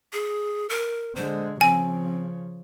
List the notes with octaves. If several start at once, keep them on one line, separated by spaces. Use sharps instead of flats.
G#4
A#4
D3 G#3 C5
C#3 F3 C4 G#5